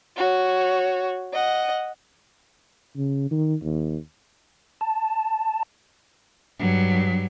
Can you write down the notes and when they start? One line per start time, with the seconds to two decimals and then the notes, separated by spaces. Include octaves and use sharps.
0.17 F#4 C#5
1.33 D#5 F#5
2.96 C#3
3.31 D#3
3.63 D#2
4.81 A5
6.59 G2 F#3